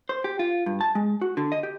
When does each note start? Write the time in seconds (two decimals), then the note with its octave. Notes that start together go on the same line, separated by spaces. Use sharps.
0.09 C5
0.24 G4
0.39 F4
0.66 G2
0.81 A5
0.95 G#3
1.21 F#4
1.37 D3
1.52 D#5
1.63 G4